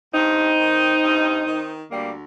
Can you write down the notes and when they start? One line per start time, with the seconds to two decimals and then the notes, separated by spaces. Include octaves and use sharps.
0.13 G2 C4 D#4
0.58 D#3
1.02 G2
1.47 D#3
1.91 D2 G3 A#3